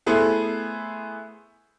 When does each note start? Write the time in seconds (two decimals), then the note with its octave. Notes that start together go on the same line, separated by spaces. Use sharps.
0.06 A3 B3 E4 G#4 C5